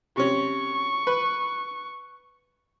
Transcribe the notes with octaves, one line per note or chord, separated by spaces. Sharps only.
C3 C#4 C#6
B4